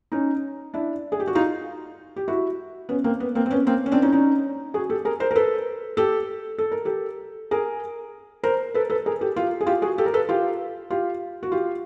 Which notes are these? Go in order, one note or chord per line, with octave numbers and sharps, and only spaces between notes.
C#4 D#4
D4 E4
G#4
G4
F#4
D#4 F4
G4
E4 F#4
B3 C#4
A#3 C4
B3
A#3 C4
C4
B3 C#4
A#3 C4
C#4
C4 D4
C#4 D#4
C#4 D#4
F#4 G#4
G4 A4
G#4 A#4
A#4 C5
A#4
A4 B4
G4 A4
A4
A#4
G4 A4
G#4 A#4
A#4 C5
A4 B4
A4 B4
G#4 A#4
G4 A4
F4 G4
G#4
F4 G4
F#4 G#4
G4 A4
A#4
A4 B4
F4 G4
F4 G4
F#4
F4 G4